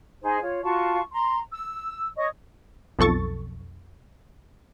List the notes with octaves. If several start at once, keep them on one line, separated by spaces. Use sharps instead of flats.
D#4 G#4 C5
F4 C#5
F4 F#4 A5 C#6
A#5 C6
E6
C#5 D#5 C#6 D#6
B1 F2 A4 C#6 A6